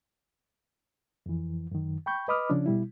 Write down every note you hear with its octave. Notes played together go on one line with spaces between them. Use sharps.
F2 E3
F#2 D#3
G5 B5 C#6 G6
B4 D#5 B5 D6 D#6 F6
C#3 F3 C#4 D4
B2 G3 E4